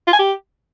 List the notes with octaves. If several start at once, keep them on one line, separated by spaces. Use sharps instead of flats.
F4
G#5
G4